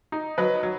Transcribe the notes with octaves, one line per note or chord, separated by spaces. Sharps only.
D#4
F#3 B4 D#5
F#3